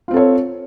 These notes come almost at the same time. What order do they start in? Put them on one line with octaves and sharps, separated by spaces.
F4 C4 A4 C#5